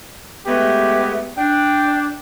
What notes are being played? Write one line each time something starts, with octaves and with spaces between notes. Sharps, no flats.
G#3 A3 B3 G4
D4 G5